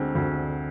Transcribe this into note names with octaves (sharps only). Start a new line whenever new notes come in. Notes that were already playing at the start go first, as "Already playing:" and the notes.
Already playing: D2 D3 G#3 C4
D2